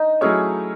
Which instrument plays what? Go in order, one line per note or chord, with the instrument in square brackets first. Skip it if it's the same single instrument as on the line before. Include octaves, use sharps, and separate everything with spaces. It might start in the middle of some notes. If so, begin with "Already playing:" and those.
Already playing: [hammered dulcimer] D#4
[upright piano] F#3 A3 E4 G#4 C#5 [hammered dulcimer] C#4